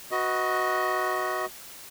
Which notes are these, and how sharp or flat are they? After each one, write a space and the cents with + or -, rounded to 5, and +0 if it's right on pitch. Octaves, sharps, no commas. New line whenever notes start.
F#4 +0 B4 +0 D#5 +20